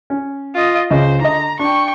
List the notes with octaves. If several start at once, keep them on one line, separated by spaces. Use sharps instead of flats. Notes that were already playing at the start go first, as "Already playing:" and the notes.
C#4
F4 D#5
C#2 C#3 C5 D#5
D3 D#5 A#5
D4 G5 C#6